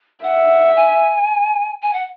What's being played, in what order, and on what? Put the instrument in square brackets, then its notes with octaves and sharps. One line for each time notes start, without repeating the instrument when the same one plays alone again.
[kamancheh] E5 [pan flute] F#5
[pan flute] G#5
G#5
F#5